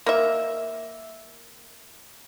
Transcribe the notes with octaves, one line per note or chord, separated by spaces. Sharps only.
A#3 E5